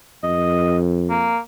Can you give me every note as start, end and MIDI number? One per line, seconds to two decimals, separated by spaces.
0.24 1.34 41
0.24 0.77 75
1.10 1.38 58